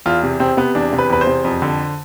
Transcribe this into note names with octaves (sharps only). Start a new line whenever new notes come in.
E2 F4
C3
C3 C4
C3 B3
E2 D4
C3
B4
E2 B4
C5
C3
F2
D3